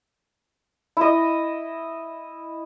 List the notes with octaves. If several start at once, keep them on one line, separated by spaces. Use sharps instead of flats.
E4 D#5